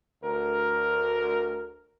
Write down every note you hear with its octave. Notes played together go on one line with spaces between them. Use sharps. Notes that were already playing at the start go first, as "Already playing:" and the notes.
D2 A#4